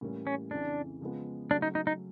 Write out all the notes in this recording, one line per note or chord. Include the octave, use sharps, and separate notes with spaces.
A2 E3 G3 A#3 C#4
C#4
F2 C#3 E3 D4
C#3 F3 G#3 B3
C#3 F#3 A3 C#4 D4
D#4
D#4
D#4